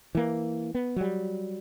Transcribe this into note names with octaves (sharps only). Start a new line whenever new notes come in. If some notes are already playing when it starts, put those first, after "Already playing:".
E3 A#3
B3
F#3 G3